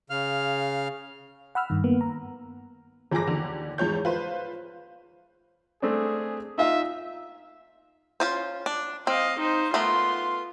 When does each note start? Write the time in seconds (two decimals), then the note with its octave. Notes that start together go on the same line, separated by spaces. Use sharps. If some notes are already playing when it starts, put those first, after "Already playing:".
0.10 C#3 F5 F6
1.55 F#5 B5 E6 F6
1.70 G2 D#3
1.84 A#3 B3
2.01 A#5
3.11 G1 F3 G#4 D6 A#6
3.27 D#2 D3
3.78 E2 G#2 F3 C#5 G6
4.05 F4 B4 C5
5.82 A3 C4 D4 G#4
6.58 D#4 F4 E5 F5
8.20 C#4 F4 C5
8.66 D4
9.07 C4 D#5 F5
9.40 D#4 C5
9.74 A3 B3 F4 A#4 C6